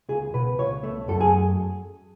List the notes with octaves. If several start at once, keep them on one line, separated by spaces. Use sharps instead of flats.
C#2 G#4
B2 B4
C#2 C#5
A3
F#2 A4
G#4